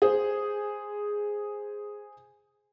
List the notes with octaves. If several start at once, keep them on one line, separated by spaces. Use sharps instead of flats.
G#4 C5